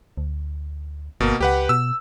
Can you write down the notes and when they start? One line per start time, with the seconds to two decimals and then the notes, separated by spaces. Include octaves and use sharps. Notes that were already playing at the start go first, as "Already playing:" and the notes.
0.17 D2
1.20 G1 B2 A#3
1.41 C#2 G4 B4 F#5
1.69 B2 E6